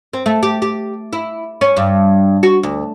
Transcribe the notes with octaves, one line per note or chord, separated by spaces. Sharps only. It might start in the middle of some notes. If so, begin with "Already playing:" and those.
C4
A3
G4
G4
E4
C#4
G2
F#4
D2